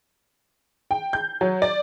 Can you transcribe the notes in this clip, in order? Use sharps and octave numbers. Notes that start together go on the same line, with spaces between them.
G5
G6
F#3
D5